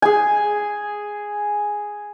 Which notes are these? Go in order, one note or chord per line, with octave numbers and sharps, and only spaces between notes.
G#4 G#5